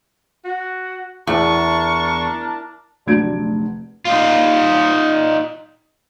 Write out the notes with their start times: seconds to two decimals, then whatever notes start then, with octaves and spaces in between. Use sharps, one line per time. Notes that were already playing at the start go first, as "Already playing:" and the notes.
0.44 F#4
1.27 E2 D4 A#4 A5 C#6
3.06 F1 D2 F#3 D4 G#6 D7
4.05 D#4 F4